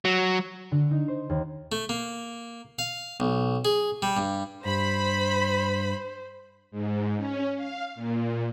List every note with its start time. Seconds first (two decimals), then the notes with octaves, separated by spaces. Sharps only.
0.05 F#3
0.72 D3
0.91 D#4
1.08 C5
1.30 D#2
1.72 A3
1.89 A#3
2.79 F5
3.20 B1
3.65 G#4
4.02 G3
4.17 G2
4.65 G2 C5 B5
6.71 G#2
7.17 C#4
7.56 F5
7.95 A#2